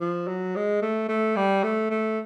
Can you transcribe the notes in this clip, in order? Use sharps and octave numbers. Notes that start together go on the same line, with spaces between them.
F3
F#3
G#3
A3
A3
G3
A3
A3